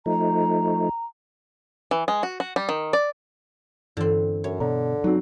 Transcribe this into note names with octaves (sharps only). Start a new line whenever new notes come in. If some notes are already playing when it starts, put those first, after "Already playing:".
F3 A3 D#4 A#5
E3
G#3
F#4
F#4
G3
D#3
D5
G2 D3 E3 C4
F#2 C#5
B2 D3 A#5
F#3 C4 D#4 F#4